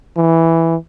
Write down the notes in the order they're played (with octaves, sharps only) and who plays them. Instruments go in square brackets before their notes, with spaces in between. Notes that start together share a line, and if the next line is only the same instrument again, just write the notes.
[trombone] E3